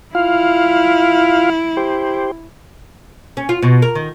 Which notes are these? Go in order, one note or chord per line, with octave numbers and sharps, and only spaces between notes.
E4 F4 F5
G4 C5
C#4
F4
B2
A#4
D#3